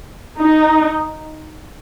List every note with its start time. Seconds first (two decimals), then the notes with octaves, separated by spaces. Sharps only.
0.39 D#4